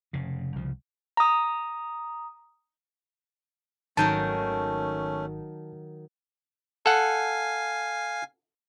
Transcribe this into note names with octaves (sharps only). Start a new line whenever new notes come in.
F1 C#3
C2 C#3 F3
A#5 D#6
G#1 D#3 F#3 A3 C#4 A#4 A5 G6
A4 F5 F#5 G#5